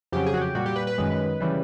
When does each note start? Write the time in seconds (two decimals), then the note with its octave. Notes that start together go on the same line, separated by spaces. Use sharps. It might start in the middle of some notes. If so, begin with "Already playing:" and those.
0.12 F2 C#3 F#3 G4
0.26 G#4
0.34 F#4
0.41 G4
0.55 A#2 G3 F#4
0.66 G4
0.76 B4
0.87 B4
0.98 F#2 D#3 G#3
1.40 C#3 E3 G3